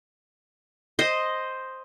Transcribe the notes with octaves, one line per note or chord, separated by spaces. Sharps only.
C5 D#5